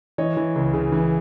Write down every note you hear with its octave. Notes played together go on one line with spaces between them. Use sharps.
E3 C#5 D#5
E3
C#2
C#3
E3